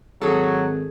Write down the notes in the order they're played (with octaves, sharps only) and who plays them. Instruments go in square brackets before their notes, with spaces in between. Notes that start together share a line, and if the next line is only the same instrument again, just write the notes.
[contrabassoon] G#1 [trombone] F#3 [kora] G#4 A4